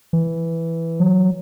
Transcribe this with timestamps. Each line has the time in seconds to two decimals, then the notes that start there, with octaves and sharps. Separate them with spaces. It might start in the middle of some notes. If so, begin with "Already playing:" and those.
0.13 E3
1.00 F#3